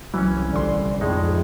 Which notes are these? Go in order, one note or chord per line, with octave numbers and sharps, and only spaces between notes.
C2 E3 F#3 C#4
A1 D3 D5 C6
F2 A2 G#3 D#4 G#4